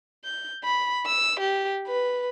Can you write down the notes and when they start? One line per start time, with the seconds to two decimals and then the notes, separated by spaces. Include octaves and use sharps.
0.24 G6
0.64 B5
1.05 E6
1.39 G4
1.87 B4